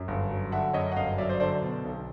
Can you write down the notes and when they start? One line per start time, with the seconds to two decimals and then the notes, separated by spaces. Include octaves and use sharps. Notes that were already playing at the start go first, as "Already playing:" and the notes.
Already playing: F#2
0.08 G1
0.31 F#3
0.52 D3 E5 F#5
0.74 F#2 C#5 D#5
0.92 F#5
0.96 G1 D#5 F5
1.18 F#3 D5 E5
1.29 C5 D5
1.40 D3 C5 D5
1.62 B2
1.85 B1